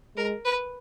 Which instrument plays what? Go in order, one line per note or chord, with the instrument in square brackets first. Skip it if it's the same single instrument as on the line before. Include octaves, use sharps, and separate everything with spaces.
[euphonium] G#3 [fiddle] A#4
[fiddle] B4